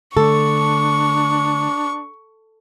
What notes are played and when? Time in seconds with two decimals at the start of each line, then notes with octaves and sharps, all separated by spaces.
0.17 D3 A3 D4 A4 C#6